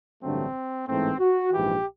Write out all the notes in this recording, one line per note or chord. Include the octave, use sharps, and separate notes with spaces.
A1 G2 D3 F#3 A3 C4
A1 G#2 E3 A3 C4
F#4
A#1 G#2 E3 G4